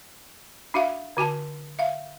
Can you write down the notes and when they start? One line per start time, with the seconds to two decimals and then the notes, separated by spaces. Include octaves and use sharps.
0.74 D4 F#4 E5 F5
1.17 D3 F#4 G#5 A5
1.79 E5 F5